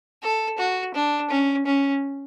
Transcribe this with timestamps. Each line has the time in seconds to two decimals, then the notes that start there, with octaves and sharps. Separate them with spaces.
0.23 A4
0.58 F#4
0.94 D4
1.30 C#4
1.66 C#4